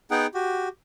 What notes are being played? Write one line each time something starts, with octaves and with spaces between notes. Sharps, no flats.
B3 D#4 G#4 F#5 G5
F#4 G4